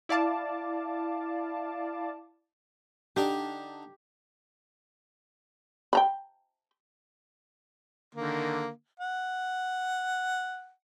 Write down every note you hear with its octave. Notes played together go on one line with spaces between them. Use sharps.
E4 D5 F5 A5 D6
D3 D4 D#4 G4
G5 A#5 B5
D3 D#3 A#3
F#5